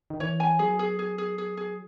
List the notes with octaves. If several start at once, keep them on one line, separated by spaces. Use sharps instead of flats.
D#3
E3 C#5
G#5
F#3 G#4
G#4
G#4
G#4
G#4
G#4